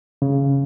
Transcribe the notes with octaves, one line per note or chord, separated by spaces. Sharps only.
C#3